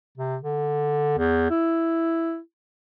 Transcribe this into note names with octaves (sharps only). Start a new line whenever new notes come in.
C3
D3
E2
E4